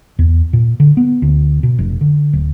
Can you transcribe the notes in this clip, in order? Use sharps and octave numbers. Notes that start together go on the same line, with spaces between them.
E2
A#2
D3
B3
D2
B2
F1
D3
D1